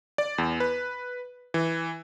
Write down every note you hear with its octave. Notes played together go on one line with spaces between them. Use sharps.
D5
E2
B4
E3